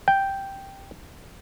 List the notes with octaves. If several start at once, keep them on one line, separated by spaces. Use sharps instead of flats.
G5